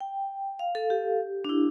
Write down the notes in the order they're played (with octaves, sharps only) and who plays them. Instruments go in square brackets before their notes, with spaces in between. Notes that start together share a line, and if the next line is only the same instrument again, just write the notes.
[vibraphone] G5
F5
A4
G4
D4
E4